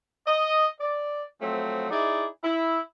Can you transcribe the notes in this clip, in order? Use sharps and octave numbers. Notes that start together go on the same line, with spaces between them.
D#5
D5
F3 F#3 A3 C4
D#4 E4 G#4 D5
E4